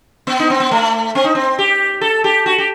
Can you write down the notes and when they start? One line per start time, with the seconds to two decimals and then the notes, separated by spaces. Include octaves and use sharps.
0.27 B3
0.40 D#4
0.50 C4
0.60 B3
0.71 A3
1.15 C4
1.24 D#4
1.35 C4
1.59 G4
2.01 A4
2.24 G4
2.46 F#4
2.58 G4